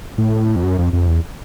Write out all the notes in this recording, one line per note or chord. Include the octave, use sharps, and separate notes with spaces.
A2
F2
F#2
F2
F2
E2